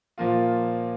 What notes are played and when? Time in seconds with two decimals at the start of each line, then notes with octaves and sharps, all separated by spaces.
0.18 A#2 F3 A#3 F4